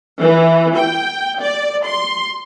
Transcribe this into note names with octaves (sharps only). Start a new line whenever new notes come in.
E3
G5
D5
C6